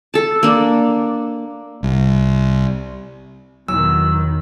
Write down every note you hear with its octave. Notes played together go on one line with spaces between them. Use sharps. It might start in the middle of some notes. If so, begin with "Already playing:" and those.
A4 A5
A#3 D4
C2
E2 B2 D#3 F#3 E6